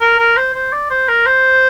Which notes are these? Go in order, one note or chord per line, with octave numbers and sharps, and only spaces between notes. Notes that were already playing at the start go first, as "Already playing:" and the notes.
A#4
A#4
C5
C5
D5
C5
A#4
C5